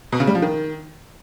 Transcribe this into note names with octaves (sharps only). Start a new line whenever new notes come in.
B2
C#3
G3
F3
D#3